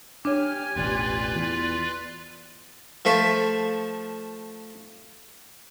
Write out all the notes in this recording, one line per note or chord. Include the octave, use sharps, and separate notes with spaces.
D4 G4 C#5 G#5 F6
E1 A1 F4 B4 D5
E2
F3 A3 E5